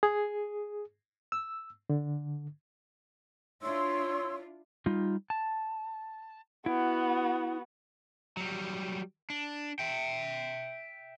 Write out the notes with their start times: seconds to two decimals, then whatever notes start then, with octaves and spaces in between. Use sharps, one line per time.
0.03 G#4
1.32 E6
1.90 D3
3.62 D4 E4 F4 C#5 C6 E6
4.86 G3 D#4 F4
5.30 A5
6.66 B3 E4 F#4
8.37 F#3 G3
9.30 D4
9.79 E5 G5